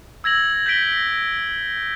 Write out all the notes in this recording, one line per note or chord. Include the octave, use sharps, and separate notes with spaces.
E6 G#6 A#6 F#7
G6 A#6 B6 D7 G7